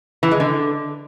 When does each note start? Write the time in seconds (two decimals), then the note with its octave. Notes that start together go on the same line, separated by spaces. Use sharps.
0.23 E3
0.31 G#3
0.40 D3